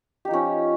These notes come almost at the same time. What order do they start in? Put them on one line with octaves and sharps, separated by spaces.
G4 D#4 F3 C#4